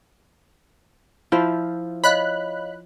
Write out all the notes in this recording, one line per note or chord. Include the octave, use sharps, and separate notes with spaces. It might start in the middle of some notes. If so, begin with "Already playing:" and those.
F3 E4 F4 C5 E5
C#5 D#5 F5 B5 F#6